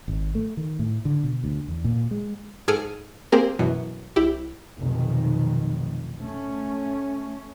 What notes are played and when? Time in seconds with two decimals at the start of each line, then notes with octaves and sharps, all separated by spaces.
0.08 G#1
0.35 A3
0.57 D#3
0.79 A2
1.05 D3
1.23 B2
1.44 D2
1.68 E2
1.84 A#2
2.11 G#3
2.68 G#2 G#4 A4 G#5 F6 D7
3.32 A#3 C4 G4 G#4 A#4
3.59 F#2 B2 E3
4.16 C2 E4 G4
4.79 F1 B1 D#3
6.20 A3 C#4